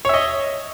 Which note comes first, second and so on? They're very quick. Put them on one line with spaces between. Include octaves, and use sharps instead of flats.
C#5 E5 D#5